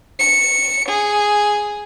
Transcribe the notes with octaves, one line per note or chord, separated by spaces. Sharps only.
C#7
G#4